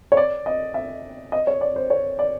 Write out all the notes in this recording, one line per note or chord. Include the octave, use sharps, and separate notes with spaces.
C#5
D5
D#5
E5
D#5
C#5
D5
C5
C#5
D5